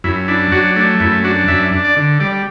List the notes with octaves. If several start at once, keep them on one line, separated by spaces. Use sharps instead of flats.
F#2 E4
D4 E4
F#3 F#4
A3 D4
F#2 E4
D4 F#4
F#2 E5
D4
D5
D3
G3 D5